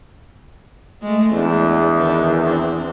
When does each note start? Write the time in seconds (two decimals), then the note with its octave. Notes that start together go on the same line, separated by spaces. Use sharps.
1.02 G#3 A3
1.32 E2 D4
1.97 D#3 D4 B4
2.42 C4 D4